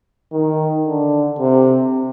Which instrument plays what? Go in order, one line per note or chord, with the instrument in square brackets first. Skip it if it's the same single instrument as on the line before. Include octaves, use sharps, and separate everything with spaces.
[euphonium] D#3
D3
C3